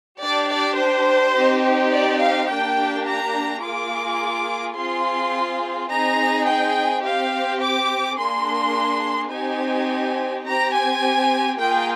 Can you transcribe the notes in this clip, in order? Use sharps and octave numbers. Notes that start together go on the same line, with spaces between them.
D4 G4 D5
D5
C5
C4 D#4 G4
D5
F5
A#3 D4 G4 G5
A#5
A#3 F4 G#4 D6
C4 F4 G#4 C6
C4 D#4 G#4 A#5
G5
C4 G4 F5
D6
A#3 D4 G#4 C6
C4 D#4 G4 G#5
C4 G4 A#5
G#5
A#3 F4 G#4 G5